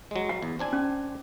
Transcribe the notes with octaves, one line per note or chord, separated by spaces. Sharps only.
F#3 G#3
F#5
E2
C4 D4 G#5
C#4